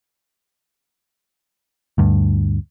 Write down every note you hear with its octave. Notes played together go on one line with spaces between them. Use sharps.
D2 G2